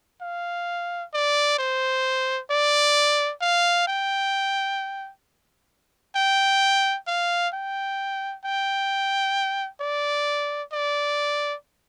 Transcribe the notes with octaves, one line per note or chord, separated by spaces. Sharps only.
F5
D5
C5
D5
F5
G5
G5
F5
G5
G5
D5
D5